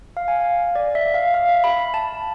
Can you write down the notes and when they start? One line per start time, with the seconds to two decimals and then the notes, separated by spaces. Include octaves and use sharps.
0.17 F5
0.28 G#5
0.40 F5
0.75 D5
0.95 E5
1.14 F5
1.34 F5
1.49 E5
1.64 B5
1.79 B5
1.94 A5